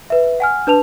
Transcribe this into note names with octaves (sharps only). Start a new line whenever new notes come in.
B4 E5
F#5 G#5 F6
D4 B4 A5 F7